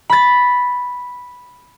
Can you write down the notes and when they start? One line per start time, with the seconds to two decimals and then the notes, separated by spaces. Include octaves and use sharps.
0.10 B5 A6